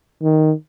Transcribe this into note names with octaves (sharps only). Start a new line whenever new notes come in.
D#3